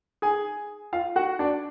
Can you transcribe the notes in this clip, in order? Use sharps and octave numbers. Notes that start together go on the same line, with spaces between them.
G#4 G#5
F4 F5
F#4 F#5
D4 D5